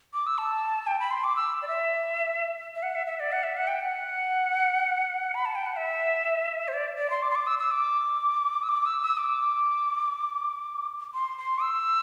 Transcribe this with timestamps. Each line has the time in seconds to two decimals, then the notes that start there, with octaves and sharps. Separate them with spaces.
0.14 D6
0.27 E6
0.38 A5
0.87 G5
1.00 B5
1.11 C6
1.24 D6
1.36 E6
1.62 D5
1.68 E5
2.75 E5
2.83 F#5
2.95 E5
3.07 E5
3.20 D5
3.32 F#5
3.43 E5
3.57 F#5
3.68 G5
3.80 F#5
5.34 B5
5.45 A5
5.55 G5
5.66 F#5
5.76 E5
6.68 C5
6.73 D5
6.98 D5
7.10 C6
7.23 D6
7.31 C6
7.35 D6
7.47 E6
7.59 E6
7.71 D6
8.63 E6
8.69 D6
8.86 E6
9.02 E6
9.18 D6
11.14 C6
11.38 C6
11.62 E6